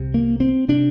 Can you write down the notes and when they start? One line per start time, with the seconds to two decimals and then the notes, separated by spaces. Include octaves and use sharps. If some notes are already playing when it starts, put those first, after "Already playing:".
Already playing: C2 C3
0.14 A#3
0.40 C4
0.68 C3 D4